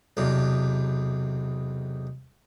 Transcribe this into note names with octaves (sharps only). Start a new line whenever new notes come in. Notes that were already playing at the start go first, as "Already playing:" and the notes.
B1 E2 C3